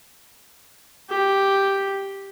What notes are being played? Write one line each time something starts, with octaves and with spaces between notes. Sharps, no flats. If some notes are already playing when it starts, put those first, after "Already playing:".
G4